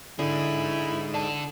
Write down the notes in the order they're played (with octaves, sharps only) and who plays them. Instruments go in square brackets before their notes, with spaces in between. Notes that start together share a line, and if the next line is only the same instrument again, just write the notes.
[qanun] D3 [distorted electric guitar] D#4 G#4 [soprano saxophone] E4
[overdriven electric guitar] D4 A4